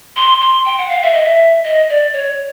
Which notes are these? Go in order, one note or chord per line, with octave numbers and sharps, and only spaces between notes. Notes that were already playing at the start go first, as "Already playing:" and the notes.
C6
C6
G5
F#5
F5
E5
D#5
E5
D#5
D5
C#5